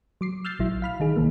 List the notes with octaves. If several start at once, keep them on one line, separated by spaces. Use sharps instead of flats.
F#3 D6 C7
E6 F6 G6 A6 C7
A#1 F#3 E4
F5 B5 F6
D#3 D#4 G#4
B1 D#3 E3 A#3